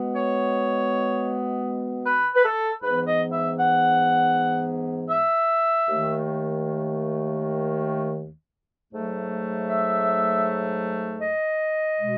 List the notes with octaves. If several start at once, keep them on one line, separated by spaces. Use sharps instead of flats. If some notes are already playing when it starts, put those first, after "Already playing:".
Already playing: B2 G#3 B3
C#5
B4
B4
A4
G#2 E3 B3 B4
D#5
E5
F#5
E5
D#2 D#3 A3
G#2 F#3 A3
E5
D#5
B2 G#3